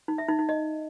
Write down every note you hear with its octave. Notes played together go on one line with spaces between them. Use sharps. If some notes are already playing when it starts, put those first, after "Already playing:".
D#4
E5
D#4
D#4
D#5